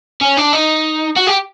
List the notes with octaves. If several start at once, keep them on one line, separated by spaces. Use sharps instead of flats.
C#4
D4
D#4
F#4
G4